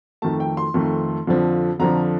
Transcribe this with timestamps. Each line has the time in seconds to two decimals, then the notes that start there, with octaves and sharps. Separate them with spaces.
0.22 F2 D#3 A3 A5
0.40 G5
0.57 C6
0.74 F2 D#3 A3
1.27 F2 D3 F3
1.80 F2 D3 F3 A#5